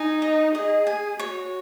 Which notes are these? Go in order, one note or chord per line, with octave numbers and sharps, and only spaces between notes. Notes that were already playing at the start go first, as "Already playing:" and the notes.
Already playing: D#4 G#5
D#5
G#4 D#5
G#5
F#4 C#5